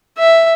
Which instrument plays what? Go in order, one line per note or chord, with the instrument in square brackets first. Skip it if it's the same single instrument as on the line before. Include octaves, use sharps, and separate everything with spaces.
[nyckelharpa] E5